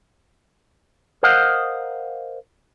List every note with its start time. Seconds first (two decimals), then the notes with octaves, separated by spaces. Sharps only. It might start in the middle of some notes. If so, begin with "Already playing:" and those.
1.23 A#4 C5 D#5 F5 F#5